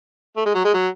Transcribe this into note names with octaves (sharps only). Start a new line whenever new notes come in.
A3
G#3
F#3
G#3
F#3